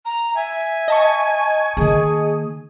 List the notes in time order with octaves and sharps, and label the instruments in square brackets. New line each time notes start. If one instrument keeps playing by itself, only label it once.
[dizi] A#5
[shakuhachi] E5 [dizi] G#5
[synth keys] D#5 A5 C#6
[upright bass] D#3 A#3 [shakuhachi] G#4